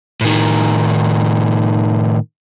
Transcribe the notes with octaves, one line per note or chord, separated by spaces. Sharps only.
A2 D#3